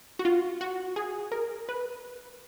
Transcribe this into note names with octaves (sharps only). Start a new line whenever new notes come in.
F#4
F4
F#4
G#4
A#4
B4